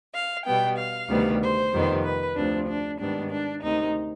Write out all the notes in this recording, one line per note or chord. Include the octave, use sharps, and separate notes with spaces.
F5
B2 G3 B3 G5
F5
D2 C3 D#3 G3 B3
C5
F2 C3 D#3 G3 B3
B4
D2 C3 F3 D4
D4
G#2 D#3 G3 B3 D4
D4
D2 C3 D#3 D#4